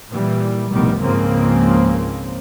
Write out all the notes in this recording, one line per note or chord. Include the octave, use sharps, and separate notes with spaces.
A#2 E3 G3
F1 B1 A2 D#3 G3 B3
C#2 G#2 C#3 F3 A#3 C4